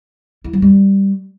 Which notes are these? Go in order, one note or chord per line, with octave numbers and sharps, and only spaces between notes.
E4
F#3
G3